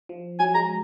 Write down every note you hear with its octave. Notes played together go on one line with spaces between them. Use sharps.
F3
F#3 G#5
G#3 A#5